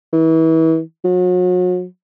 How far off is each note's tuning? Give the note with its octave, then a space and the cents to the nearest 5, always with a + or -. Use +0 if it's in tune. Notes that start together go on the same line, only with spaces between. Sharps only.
E3 -35
F#3 -40